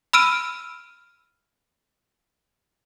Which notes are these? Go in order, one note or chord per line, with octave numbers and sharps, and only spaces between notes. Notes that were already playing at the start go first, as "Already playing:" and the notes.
B5 E6 F6 D7 D#7